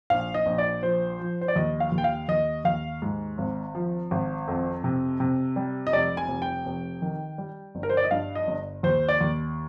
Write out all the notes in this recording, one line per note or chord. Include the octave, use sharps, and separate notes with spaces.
A#1 F5
D#5
A#1
D5
F3 C5
F3
C5
D5
D#2 D#5
F5
D#2
G5
F5
D#2 D#5
D#2 F5
G#2
G#1
F3
G#1
F2
C3
C3
G3
D#5
F1 D5
G#5
F1
G5
F1
D#3
G3
G1
A#4
C5
D5
D#5
G2 F5
D#5
G1
D#2 C5
D5
D#2